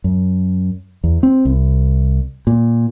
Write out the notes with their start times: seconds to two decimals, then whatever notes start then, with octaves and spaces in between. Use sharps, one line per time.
0.04 F#2
1.04 E2
1.23 C4
1.45 C2
2.47 A#2